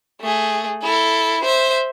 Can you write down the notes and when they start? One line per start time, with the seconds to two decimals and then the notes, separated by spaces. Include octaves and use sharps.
0.21 A3 G#4
0.83 E4 A4
1.43 C5 E5